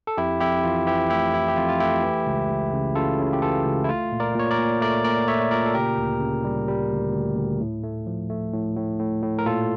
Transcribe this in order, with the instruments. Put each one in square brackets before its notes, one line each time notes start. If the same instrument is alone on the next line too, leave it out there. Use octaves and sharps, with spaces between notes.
[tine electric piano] A4
F2 E4 G4
F2 E4 G4
E3 F4
E3 E4 G4
A3 E4 G4
E3 E4
G4
F2 F4
F4
A3 E4 G4
E3
C#2
C#2
C#3
C#3 F4 A4
C#3
G4
E3 F4 A4
C#2
E4
A3 F4
A#2
A#4 D5
A#2 C#5
A#4 D5
A#2
A3 A#4 D5
A#2 A#4 D5
A3 C#5 E5
A#2 A#4 D5
A4
C#3 G4 A#4
D2
C#3
G3
G3
D2
D2
D2
A2
A3
F3
A3
A2
A2
A2
A2
A#4
A#2 F4 A4